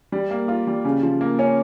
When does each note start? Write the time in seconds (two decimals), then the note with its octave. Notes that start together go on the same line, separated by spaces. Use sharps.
0.12 G3
0.30 A#3
0.48 F4
0.67 G3
0.85 C#3
1.02 F3
1.21 A#3
1.39 C#4